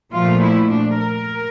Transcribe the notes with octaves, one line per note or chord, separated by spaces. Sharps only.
A#2 F3 A3 F4
E4
D4
A#4